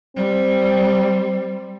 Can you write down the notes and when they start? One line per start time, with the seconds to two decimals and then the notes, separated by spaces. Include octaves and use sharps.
0.17 G3 C4